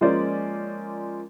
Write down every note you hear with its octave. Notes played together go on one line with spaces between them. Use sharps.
F3 G#3 A#3 C#4 C5 D5